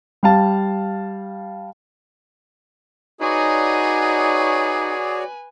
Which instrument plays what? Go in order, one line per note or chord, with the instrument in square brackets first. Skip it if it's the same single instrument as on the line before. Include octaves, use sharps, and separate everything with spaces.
[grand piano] G3 F5 A5
[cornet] D#4 [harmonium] F#4 C#5 D5 [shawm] G#4 [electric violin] B4 G#5